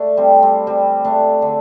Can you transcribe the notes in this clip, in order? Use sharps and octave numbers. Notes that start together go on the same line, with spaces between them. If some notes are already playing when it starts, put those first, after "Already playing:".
Already playing: A3 D4
G3 C4
G3 C4
G3 C4
A3 D4
D3